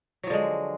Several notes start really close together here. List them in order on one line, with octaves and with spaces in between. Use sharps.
F#3 F3 D3 G#3